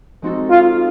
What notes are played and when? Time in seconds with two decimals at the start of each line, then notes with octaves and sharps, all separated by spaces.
0.22 G#3 C4 D#4 F#4 A4
0.50 F4